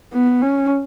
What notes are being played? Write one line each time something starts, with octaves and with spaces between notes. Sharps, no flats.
B3
C#4